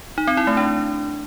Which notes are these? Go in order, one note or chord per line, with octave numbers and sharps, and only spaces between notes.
D#4
C4
E4
A3
D4